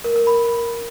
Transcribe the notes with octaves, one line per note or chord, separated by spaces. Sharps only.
A#4
A#4
B5